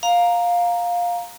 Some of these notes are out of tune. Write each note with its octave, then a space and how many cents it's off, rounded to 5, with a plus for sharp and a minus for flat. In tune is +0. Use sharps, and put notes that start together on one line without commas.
F5 +10 A#5 +0